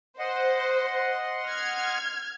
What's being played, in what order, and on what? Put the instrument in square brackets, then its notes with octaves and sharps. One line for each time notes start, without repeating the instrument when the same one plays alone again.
[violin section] C5 [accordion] D#5 F#5 C6
[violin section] F6 G#6